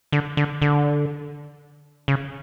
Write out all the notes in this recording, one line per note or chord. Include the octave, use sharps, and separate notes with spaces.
D3
D3
D3
C#3